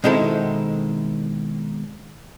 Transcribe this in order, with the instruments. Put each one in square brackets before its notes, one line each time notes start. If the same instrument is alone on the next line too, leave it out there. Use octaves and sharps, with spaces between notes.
[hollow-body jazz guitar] B2 D#3 G#3 C4 E4 A4